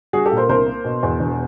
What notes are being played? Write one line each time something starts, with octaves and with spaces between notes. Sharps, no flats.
G3 F#4 G#4
G4 A4
A#2
A#4 C5
C2 A#4 C5
A#3
B2
E2
E1